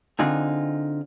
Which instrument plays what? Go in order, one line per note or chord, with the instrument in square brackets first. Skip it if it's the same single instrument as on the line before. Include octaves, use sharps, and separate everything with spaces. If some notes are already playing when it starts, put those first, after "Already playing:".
[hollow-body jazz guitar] D3 C4 D#4 F4 G#4